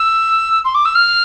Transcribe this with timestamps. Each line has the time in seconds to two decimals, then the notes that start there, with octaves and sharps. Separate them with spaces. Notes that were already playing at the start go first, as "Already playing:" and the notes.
Already playing: E6
0.65 C6
0.75 D6
0.85 E6
0.95 F6